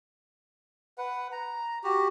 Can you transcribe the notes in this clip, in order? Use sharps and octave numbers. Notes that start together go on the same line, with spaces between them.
B4 F#5
A#5
F#4 G4